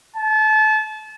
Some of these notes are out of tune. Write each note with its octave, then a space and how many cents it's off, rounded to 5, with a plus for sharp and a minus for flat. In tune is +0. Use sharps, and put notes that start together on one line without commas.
A5 -30